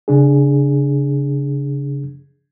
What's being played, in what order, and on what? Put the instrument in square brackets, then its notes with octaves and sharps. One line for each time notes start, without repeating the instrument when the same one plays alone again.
[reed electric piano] C#3 D4 G#4